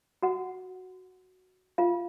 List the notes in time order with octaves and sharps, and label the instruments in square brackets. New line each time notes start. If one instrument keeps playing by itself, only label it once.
[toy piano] F#4 F#5
F4 F5